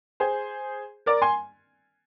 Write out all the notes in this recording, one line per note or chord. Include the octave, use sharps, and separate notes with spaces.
G#4 C5
A#4 D5
G#5 C6